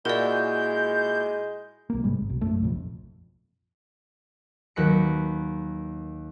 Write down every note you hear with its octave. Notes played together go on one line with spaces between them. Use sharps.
A#2 G#3 E4 F#4 A#4 D5 G6
B1 A#3
G#2 C3 G3 G#3
G#1
B1
F#2 A3
F1 A#1 F2
D#2 F#3 B4 D#5 B5 C#7